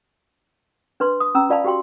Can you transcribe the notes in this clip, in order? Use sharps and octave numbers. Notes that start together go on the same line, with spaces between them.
D4 B4 C6
D#6
C#4 A#5 E6
F4 D5 F5 A5 B5
F#4 G4 G5 C6